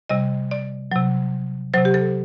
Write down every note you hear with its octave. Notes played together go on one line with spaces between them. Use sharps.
C3 G3 D#5
D5
C3 F#3
C3 F#3 C5
G4
A4